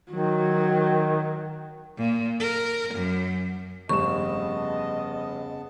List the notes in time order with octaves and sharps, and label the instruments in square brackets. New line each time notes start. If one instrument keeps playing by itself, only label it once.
[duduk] D#3 [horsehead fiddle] F#3
[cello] A#2
A#4
F#2
[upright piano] F1 G2 E7 [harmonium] C#3 B3 A5 [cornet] D#5 [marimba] C#6